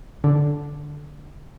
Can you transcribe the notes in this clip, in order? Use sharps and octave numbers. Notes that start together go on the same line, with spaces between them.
D3